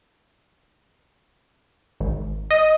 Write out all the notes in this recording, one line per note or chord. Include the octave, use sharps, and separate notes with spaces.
G#1
D#5